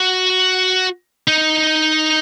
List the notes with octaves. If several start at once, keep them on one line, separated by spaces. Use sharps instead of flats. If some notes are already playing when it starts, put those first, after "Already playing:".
Already playing: F#4
D#4